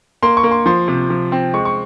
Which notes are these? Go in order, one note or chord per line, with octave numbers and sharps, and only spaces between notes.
A#3 C6
C#6
A#3
C6
F3 C6
C3
F3
C4
G#3 C#6
C#6